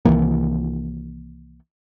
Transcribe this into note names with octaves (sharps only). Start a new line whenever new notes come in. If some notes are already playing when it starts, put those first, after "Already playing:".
C2 D#3 E3 A#3